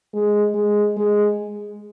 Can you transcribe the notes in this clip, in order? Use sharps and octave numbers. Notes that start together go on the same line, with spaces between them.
G#3
G#3
G#3